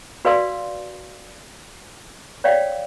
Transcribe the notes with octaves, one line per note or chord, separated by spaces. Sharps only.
F#4 B4 D5 F5 C6 E6
C#5 D5 F5 G5